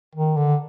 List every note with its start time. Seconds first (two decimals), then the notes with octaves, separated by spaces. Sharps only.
0.15 D#3
0.37 D3